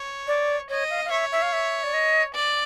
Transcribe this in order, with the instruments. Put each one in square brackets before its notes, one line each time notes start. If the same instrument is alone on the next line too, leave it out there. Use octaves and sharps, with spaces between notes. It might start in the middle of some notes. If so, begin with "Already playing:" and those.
Already playing: [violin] C#5
[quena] D5
[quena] C#5 [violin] D#5
[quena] F5
F5
[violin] C#5 [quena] E5
[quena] E5
F5
E5
D5
D#5
[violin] D5